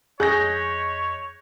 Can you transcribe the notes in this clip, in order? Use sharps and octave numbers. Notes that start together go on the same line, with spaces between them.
F2 G#4 C#5 D#5 F#6 G6 A#6 B6